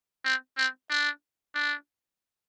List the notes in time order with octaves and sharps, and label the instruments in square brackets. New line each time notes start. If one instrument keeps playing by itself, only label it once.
[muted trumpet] C4
C4
D4
D4